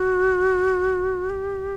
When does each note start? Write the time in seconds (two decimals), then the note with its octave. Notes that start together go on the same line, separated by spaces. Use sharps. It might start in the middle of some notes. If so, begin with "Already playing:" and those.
Already playing: F#4
1.30 G4